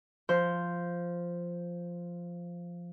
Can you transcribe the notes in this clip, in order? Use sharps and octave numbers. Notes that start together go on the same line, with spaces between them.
F3 C5 C6